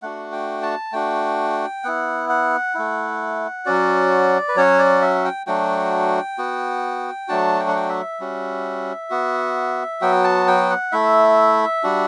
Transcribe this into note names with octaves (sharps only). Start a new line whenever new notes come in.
A3 D4 F#4 F#5
G5
A5
A3 D4 F#4 G5
B3 E4 F#5
F#5
A3 E4
F#3 C#4 F#4 D5
B4
F#3 C#4 F#4 C#5
D5
E5
G5
F#3 A3 D4 F#4 G5
B3 F#4
F#3 A3 D4 F#4 A5
G5
F#5
G5
E5
G3 C#4 F#4
B3 F#4
F#3 B3 F#4 G5
A5
G5
F#5
A3 E4 E5
G3 D4 F#4